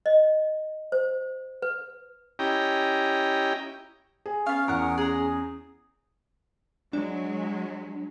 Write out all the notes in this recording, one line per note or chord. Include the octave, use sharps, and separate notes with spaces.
D#5
C5
B4
C#4 E4 G4 D#5 G5 A#5
G#4
B3 C#4 F5 C#6
E2 A#4 F#5
D#6
G#4 A#5
F#3 G#3 D4